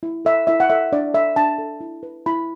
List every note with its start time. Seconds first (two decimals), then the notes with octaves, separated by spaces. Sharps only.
0.03 E4
0.25 A4 E5
0.47 E4 E5
0.60 F#5
0.70 A4 E5
0.92 D4 D5
1.14 A4 E5
1.36 D4 A5
1.58 A4
1.81 E4
2.03 B4
2.26 E4 B5